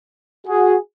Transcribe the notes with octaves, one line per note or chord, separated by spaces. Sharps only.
F#4 G#4